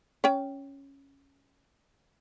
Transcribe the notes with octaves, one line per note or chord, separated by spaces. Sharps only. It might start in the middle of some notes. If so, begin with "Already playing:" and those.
C#4 G5